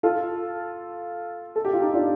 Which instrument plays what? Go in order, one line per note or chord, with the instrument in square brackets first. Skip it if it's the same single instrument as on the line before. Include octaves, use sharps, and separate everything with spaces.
[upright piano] F4 A4
A4
G4
F4
D#4 G4
D4 F4